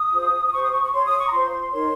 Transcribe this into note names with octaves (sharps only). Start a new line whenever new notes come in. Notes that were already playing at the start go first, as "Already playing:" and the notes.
Already playing: D#6
F4 G#4 C5
D#6
G4 C5 C#6
D#6
C#6
C#6
G4 C#5 C6
D#6
C#6
A#5
F4 C5 C6
D#4 A#4 C#5 C6